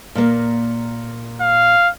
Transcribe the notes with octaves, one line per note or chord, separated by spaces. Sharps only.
A#2 A#3
F5